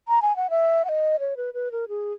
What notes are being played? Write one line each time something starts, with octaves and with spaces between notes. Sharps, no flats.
A#5
G#5
F#5
E5
F#5
D#5
C#5
B4
B4
A#4
G#4